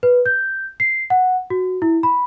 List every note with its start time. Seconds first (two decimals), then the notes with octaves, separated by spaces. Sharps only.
0.03 B4
0.26 G6
0.80 C7
1.10 F#5
1.50 F#4
1.82 E4
2.03 B5